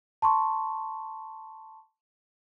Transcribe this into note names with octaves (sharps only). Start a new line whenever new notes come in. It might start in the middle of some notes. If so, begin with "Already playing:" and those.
A5 C6 C#6